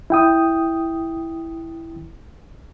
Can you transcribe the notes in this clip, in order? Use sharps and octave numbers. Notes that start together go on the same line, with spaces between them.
E4 G5 D#6